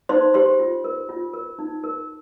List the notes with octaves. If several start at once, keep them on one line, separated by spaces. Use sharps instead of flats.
D#4 C5 C6
G4 C5 C6
F4
A#4
F4
A#4
D#4
A#4